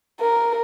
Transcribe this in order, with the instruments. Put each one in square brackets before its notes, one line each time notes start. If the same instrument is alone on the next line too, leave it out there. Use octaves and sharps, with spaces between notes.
[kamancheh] A#4